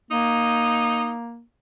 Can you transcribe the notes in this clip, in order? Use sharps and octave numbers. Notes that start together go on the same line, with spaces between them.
A#3 D#4